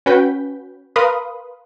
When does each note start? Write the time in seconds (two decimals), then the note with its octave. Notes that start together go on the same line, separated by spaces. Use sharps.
0.06 C#4 F#4 B4 G5 G6 B6
0.96 A#4 B4 F5 B5 C6 D#6